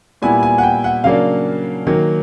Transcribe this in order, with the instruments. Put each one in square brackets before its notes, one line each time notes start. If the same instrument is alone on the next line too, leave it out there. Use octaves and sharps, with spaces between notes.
[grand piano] A#2 G3 B3 E4 G#5
G#5
F#5
G5
F#5
C#3 F#3 A#3 D4 F5
D#3 F#3 A#3